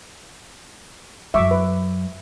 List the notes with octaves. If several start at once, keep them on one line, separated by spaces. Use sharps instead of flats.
F#2 F#3 E5 C#6 D6
B4